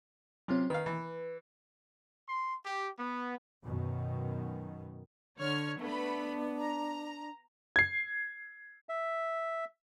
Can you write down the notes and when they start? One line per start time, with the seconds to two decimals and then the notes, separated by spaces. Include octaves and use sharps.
0.48 C3 F#3 C4 C#4 F4
0.70 D#3 B4 F5
0.86 E3
2.27 C6
2.64 G4
2.97 B3
3.65 F#2 B2 D#3
5.39 D3 C#5 F6
5.80 A3 B3 D4 B4 B5
6.60 A#5
7.76 G#6 C7
8.89 E5